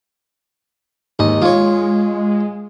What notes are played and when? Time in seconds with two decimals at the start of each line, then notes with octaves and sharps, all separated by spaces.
1.19 D#2 G#2 D#5
1.42 G#3 F4 C#5